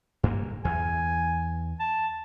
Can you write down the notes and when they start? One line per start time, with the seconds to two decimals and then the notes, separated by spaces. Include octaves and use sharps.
0.23 G2 A#3
0.65 E2 G#5
1.80 A5